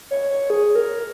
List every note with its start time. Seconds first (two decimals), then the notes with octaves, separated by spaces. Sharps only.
0.11 C#5
0.30 C#5
0.50 G#4
0.75 A#4